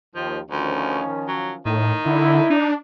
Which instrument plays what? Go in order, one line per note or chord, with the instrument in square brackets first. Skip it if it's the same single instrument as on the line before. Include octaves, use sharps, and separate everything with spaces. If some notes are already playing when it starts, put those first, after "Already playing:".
[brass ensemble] D#2 [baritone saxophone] F3
[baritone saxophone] D2 [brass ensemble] D#3 F3 C#4
[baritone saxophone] F#3
[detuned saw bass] A2 [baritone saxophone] D#3
[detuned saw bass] D3 [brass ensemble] E4
[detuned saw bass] D4 [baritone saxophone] D#4